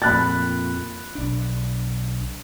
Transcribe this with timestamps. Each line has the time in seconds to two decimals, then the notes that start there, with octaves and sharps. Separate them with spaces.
0.02 F2 A#2 B5 F#6 A6
1.15 B1 D4